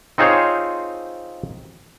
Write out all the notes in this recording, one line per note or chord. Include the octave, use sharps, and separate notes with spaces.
C4 D#4 F4 G#4 C5 C#5